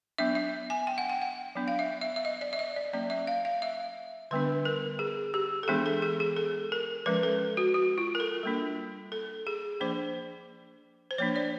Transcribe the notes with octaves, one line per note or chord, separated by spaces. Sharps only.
F#3 B3 D4 E5
E5
G#5
G5
F#5
G5
F#5
F#3 B3 D4
F5
E5
E5
E5
D#5
D5
E5
D#5
D5
F#3 A#3 C#4 D5
E5
F5
F5
E5
D3 G3 B3 D4 B4
A#4
G#4
G4
A4
E3 G#3 B3 D4 G#4
A4
G#4
G#4
A4
A#4
F3 G#3 C#4 B4
A4
F#4
F#4
F4
A#4
A4
G3 A#3 D4
A4
G#4
F3 A#3 D4 C5
C5
F3 A#3 D4 C#5
D5